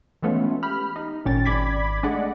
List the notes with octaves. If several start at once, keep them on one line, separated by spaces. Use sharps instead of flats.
E3 G#3 A3 B3 C#4 F4
G4 B5 F6
D#4
G#1 A#2 C#4 G5 A6
G#1 D5 B5 D6 G#6 B6
G#3 A3 D4 D5 D#5 F#5